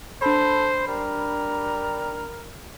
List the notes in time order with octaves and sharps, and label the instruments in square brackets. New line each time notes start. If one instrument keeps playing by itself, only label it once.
[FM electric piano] D4 B5 [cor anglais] A4 [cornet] C5
[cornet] G3 [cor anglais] A#4